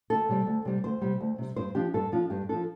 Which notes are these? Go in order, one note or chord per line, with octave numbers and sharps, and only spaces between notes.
D2 A4
C3 G3
D2
C3 G3
D2 C5
C3 G3
D2
C3 G3
G2 C5
F3 D4 G4
G2 A4
F3 D4 F4
G2 G4
F3 D4 A4